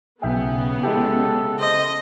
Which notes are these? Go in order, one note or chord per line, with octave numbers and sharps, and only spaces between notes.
B1 C#3 B3 G#4 E5 G5
G#3 E4 G4 A4
C5 D#5